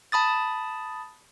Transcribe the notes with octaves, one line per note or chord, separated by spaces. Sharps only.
A5 B5 D#6 A6